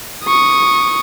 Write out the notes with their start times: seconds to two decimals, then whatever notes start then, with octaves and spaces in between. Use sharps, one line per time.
0.25 C#6 D#6